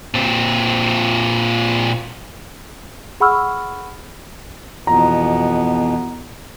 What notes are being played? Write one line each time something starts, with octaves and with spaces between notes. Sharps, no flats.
A#2 C4
G#4 F#5 B5 C#6 E6 F6
F2 B2 E3 B3 A#5